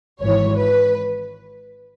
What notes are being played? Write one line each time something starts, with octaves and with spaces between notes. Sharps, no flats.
G#1 G#2 E3 C#5
B4